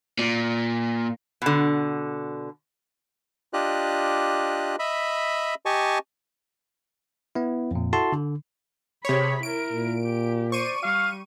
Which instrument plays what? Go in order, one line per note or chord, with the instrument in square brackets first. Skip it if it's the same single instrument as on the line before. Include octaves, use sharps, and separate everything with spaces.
[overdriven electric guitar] A#2
[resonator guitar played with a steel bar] B2 D3
[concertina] D4 F4 G4 D#5 F#6
D#5 E5 B5
G4 D#5 G#5 A5 C#6
[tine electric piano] B3 E4
F2 A#2
E4 F#4 A4 A5 C6
D3
[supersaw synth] C3 C#5 [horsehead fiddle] G#4 B5
[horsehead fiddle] E4 A#4 [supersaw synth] D7
[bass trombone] A#2
[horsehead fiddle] G4
[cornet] C5 [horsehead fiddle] D5 [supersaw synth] C#6 D#7
[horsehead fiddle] G3 [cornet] F5